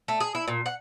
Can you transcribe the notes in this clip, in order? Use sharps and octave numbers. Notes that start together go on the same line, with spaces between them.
A3
G#4
E4
A#2
F#5